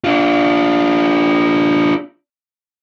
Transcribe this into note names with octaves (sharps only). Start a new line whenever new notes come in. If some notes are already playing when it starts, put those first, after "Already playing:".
D4 F4